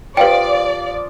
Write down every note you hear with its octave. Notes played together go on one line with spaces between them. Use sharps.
F3 G4 B4 D5 F5 G5 D7